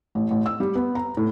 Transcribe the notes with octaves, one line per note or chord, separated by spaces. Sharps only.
A1
A1
E6
G3
B3
A#5
A2